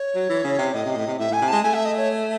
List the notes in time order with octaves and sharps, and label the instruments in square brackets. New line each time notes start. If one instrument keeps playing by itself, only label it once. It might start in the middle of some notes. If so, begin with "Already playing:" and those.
Already playing: [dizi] C#5
[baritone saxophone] F#3
E3
C#3
C3
[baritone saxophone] A2 [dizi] D#5
[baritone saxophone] C3
A2
C3
[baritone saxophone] A2 [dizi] E5
[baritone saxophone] A2 [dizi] G#5
[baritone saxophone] C3
[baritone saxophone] G#3 [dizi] A5
[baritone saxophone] A3 [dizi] G#5
[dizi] E5
D#5
C#5